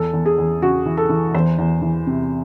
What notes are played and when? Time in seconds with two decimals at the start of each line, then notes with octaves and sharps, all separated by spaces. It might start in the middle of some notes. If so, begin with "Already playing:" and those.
Already playing: E2 A4
0.13 E2
0.26 G#4
0.38 E2
0.61 C#3 F#4
0.86 E3
0.97 A4
1.09 E3
1.34 E2 C5
1.58 E2
1.82 E3
2.07 C3